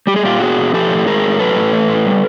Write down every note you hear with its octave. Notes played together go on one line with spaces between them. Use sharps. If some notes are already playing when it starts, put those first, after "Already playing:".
G3 G4
G#4
A#2 F4 G4
B3 F#4 G#4
A#2
F3 G4 A4
A2
G#3 G#4 A#4
A2
F#3 A4 B4
A2
A3
A2
G3